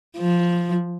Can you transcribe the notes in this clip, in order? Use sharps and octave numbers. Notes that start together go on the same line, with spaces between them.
F3